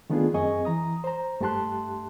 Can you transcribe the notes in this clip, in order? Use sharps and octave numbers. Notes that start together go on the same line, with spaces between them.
D#3 A3 B3 D4 F4 G#4
F#2 C4 G#4 D#5 G#5 C#6
E3 A#5 D#6
C5 A#5
G2 A3 G4 A5 C6 F#6